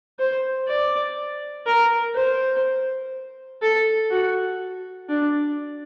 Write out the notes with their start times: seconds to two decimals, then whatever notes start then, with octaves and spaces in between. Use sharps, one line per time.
0.19 C5
0.68 D5
1.66 A#4
2.15 C5
3.62 A4
4.10 F#4
5.09 D4